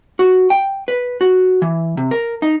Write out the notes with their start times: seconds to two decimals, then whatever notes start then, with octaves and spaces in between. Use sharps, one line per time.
0.19 F#4
0.50 G5
0.88 B4
1.21 F#4
1.62 E3
1.97 C3
2.11 A#4
2.42 D#4